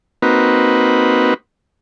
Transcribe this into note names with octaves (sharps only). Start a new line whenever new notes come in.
A#3 C4 D#4 F#4 B4